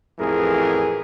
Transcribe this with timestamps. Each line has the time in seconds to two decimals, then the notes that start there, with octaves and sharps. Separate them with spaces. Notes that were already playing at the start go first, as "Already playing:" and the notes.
0.19 A1 F2 E3 G#4 A#4